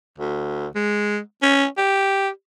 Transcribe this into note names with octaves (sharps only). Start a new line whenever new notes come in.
D2
G#3
C#4
G4